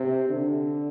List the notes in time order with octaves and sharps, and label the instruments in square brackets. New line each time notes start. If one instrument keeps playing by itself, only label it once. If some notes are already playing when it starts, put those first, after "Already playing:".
Already playing: [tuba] C3
D3